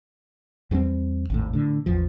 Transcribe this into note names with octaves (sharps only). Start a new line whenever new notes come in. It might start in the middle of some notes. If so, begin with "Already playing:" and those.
E2 G2 G3 C4
G#1 D#2 A2
A2 D3
A1 E2 F3